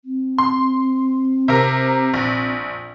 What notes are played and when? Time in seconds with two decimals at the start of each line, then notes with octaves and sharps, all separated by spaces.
0.05 C4
0.38 C6
1.48 C3 A#4
2.14 A#1